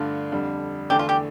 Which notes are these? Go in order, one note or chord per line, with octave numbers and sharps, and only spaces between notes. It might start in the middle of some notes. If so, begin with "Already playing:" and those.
Already playing: G2 D3 A3 D4 F4
F2 D3 G3
E2 D3 A3 D4 G4
F4
G4